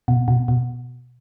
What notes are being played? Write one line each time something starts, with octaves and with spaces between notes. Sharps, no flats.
B2
B2
B2